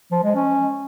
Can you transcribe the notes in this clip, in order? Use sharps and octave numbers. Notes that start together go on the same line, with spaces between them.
F3
G#3
C#4